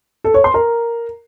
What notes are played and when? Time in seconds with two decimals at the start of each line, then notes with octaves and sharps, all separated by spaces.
0.24 A4
0.34 C#5
0.44 C6
0.54 A#4